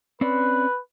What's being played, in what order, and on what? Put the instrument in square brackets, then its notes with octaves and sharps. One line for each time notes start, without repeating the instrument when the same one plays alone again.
[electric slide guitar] C4 C#4 D5 [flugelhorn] B4